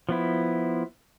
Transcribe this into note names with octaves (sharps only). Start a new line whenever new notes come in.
F3 B3 E4